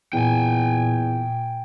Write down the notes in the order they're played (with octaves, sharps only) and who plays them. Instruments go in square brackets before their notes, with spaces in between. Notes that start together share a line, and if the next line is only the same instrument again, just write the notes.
[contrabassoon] E2 [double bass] A#2 [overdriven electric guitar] G5 G#5